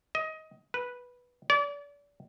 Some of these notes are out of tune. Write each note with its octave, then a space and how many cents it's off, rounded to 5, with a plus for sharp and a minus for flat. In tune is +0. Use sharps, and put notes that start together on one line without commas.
D#5 +20
B4 -10
D5 -35